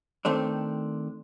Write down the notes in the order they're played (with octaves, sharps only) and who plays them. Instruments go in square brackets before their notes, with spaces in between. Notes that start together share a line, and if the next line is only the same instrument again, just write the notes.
[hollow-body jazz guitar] D#3 A3 C4 D4